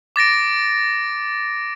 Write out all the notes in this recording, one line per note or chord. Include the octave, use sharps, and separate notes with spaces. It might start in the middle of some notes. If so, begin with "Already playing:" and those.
D6 A6 A#6 D7